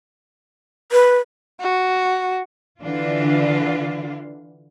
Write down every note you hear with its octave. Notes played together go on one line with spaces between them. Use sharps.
B4
F#4
D3 E3 D4 F4